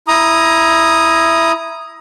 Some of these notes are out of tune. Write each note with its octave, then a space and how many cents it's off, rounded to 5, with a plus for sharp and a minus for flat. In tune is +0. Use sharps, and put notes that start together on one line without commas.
E4 +0 A#5 +20 D#6 +0